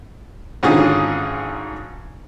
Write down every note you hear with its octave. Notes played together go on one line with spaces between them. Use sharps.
G#1 G#2 D3 C#4 F4 G#4